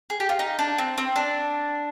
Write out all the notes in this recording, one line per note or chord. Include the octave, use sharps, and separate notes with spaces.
G#4
G4
F4
D#4
D4
C4
C4
D4